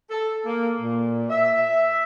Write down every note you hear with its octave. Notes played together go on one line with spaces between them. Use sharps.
A4
A#3
A#2
E5